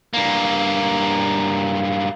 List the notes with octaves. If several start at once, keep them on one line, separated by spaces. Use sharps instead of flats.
G2 A#3